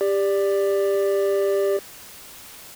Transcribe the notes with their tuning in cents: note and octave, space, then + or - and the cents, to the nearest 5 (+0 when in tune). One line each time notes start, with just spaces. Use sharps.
G4 +20 D5 +0